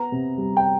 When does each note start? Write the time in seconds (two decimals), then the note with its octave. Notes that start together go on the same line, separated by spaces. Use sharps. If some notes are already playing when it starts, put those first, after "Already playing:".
Already playing: B3 A#5
0.12 C3
0.38 G3
0.57 G5